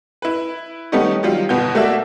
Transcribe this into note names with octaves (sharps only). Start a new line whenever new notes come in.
E4 B4
D#3 G3 A3 B3 C#4 D#4
D#3 F#3 G3 F4
G1 B2 B3 G6
A3 A#3 F#4 D5 E5